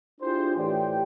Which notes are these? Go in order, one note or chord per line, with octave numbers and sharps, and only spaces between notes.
D4 E4 F4 G4 G#4 C5
A2 E3 G4 D5 G5